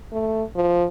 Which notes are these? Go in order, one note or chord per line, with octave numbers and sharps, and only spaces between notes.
A3
F3